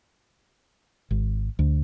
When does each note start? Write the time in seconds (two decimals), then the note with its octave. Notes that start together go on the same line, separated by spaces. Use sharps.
1.11 G#1
1.59 D2